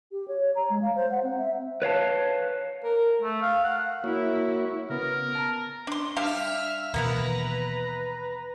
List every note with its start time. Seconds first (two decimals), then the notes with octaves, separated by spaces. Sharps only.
0.12 G4
0.28 C#5
0.56 A#5
0.70 G#3
0.82 F5
0.96 C5
1.11 F#5
1.23 C4
1.38 E5
1.82 B4 C#5 F5 A5
2.84 A#4
3.22 A3
3.42 F5
3.64 F#5
4.04 A#3 E4 F#4 C#5
4.90 C#3 B3 A#4
5.35 A5 A#5
5.87 D4 C6
6.16 G3 D4 E5 F5 F6
6.94 D#2 B2 E3 A#3 B3 E4 B4 A#5